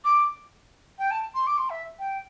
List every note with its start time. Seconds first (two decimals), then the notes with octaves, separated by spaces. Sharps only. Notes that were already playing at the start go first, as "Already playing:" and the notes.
0.04 D6
0.99 G5
1.11 A5
1.34 C6
1.47 D6
1.58 C6
1.70 E5
1.99 G5